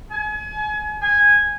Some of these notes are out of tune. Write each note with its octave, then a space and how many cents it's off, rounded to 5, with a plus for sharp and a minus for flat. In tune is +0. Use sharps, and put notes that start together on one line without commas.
G#5 +35
G#5 -10